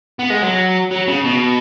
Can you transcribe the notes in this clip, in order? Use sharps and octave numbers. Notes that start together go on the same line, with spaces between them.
B3
G#3
F#3
F#3
C#3
B2